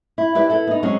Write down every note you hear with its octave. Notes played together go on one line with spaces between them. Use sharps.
E4
E4 G4 B4 D5 E5
E4 A4
B3 D#4
F#3 G#3 C4 C#4 F#4